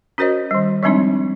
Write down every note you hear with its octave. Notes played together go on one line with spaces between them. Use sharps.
C#4 F#4 A#4 C5 C#5 D#5
D#3 G3
F3 G3 G#3 C4 D4 D#4